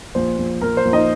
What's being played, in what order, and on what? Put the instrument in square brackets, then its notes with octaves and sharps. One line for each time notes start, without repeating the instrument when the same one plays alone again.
[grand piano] A#1 C5
A#1
A#1 A#4
C5
A#1
D#4 D#5